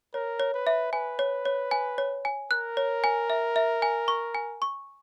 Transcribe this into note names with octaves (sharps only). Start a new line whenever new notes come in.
A#4 C#5
C#5
B4
E5
B4 G#5
C#5
C#5
G#5
C#5
G#5
A#4 F#6
C#5
G#5
E5
E5
G#5
C#6
G#5
C#6